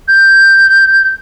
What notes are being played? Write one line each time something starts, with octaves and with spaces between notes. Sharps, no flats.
G6